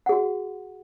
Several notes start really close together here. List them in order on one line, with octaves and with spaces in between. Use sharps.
F#5 G#4 F#4